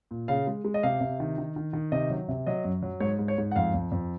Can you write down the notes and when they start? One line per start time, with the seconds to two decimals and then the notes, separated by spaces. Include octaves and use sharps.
0.11 A#2
0.28 C#3 F5
0.47 G#3
0.64 G#3
0.74 D#5
0.83 C3 F5
1.01 C3
1.20 D#3
1.38 D#3
1.56 D#3
1.73 D#3
1.92 C3 D#5
2.10 F#3
2.29 C3
2.46 F#3 D#5
2.65 F#2
2.83 F#3
3.00 G#2 C#5
3.19 G#2
3.28 C#5
3.38 G#2
3.51 F#5
3.56 F2 F5
3.74 F2
3.92 F2